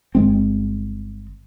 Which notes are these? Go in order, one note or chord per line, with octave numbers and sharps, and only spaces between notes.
G1 G#3 C4